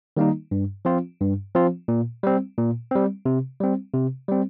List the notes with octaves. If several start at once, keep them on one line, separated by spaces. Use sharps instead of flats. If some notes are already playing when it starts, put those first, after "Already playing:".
D#3 G3 A#3 D#4
G2
F3 C4 F4
G2
F3 C4 F4
A#2
G3 C4
A#2
G3 C4
C3
G3 C4
C3
G3 C4